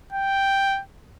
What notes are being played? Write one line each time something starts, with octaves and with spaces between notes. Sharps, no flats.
G5